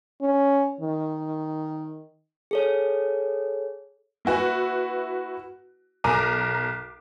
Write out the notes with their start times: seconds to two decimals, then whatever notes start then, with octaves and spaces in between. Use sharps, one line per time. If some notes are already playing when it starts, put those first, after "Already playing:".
0.22 C#4
0.81 D#3
2.51 G#4 A4 C#5
4.25 A#3 E4 F#4 B4
6.04 B1 A#4 A#5 D6 D#7